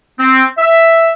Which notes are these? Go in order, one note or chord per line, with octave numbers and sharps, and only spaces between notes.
C4
E5